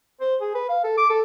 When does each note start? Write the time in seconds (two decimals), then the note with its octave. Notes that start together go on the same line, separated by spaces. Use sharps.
0.21 C5
0.41 G#4
0.54 B4
0.69 F5
0.84 A4
0.98 D6
1.10 A4